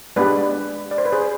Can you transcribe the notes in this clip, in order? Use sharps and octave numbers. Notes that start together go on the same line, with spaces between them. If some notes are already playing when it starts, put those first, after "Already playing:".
G#3 B3 D4 G4 B4 D5
D5
C5
B4
G#4 C5